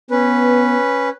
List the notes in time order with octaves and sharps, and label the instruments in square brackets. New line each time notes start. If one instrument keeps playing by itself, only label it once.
[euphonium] B3 [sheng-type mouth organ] C#4 B4